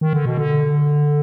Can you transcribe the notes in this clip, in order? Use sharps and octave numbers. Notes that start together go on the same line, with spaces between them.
D#3
D3
B2
D3